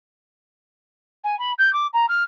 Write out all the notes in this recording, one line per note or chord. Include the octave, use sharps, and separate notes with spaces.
G#5
B5
G6
D6
A#5
F6